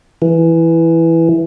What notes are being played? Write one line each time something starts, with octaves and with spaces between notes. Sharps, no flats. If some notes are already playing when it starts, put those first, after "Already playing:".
E3